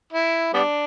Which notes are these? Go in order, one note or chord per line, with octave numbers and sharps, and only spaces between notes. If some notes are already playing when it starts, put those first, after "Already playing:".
E4
G3 B3 D4